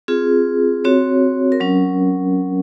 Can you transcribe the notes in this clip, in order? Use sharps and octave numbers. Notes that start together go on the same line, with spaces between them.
C4 F4 G#4
C4 F#4 C#5
A#4
F#3 C#4